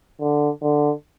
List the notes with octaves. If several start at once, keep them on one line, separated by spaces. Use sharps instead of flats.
D3
D3